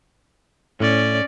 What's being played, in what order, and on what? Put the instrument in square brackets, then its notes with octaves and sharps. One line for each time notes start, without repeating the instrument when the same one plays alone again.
[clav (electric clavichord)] A2 [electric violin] C#4 D5